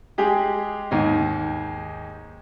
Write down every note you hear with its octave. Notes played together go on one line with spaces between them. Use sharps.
G#3 G4 G#4
D#2 G#2 D#5